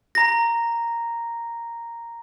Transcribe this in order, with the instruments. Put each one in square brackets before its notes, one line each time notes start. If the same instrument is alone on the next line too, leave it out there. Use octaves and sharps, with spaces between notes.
[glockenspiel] A#5 A#6